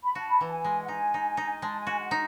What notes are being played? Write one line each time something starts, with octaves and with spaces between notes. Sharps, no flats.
B5
F#4 A5
B5
E3 A5
G#5
G#3
F#5
D#4 G#5
D#4
D#4
G#3 A5
G#5
F#4
F#5
D#4